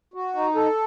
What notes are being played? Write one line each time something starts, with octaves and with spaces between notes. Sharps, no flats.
F#4
D#4
A4